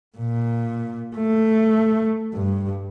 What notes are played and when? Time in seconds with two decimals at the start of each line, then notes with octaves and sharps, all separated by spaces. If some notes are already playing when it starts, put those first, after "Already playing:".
0.17 A#2
1.16 A3
2.34 G2